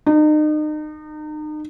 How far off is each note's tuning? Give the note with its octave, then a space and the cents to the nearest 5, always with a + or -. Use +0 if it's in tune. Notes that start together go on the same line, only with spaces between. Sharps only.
D#4 -35